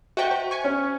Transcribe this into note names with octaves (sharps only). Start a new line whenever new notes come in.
F#4 C5 D#5 E5 G5 C#6
C5
G#5 C#6
C#4